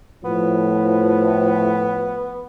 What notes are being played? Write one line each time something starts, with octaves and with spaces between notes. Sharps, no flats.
A2 F3 B3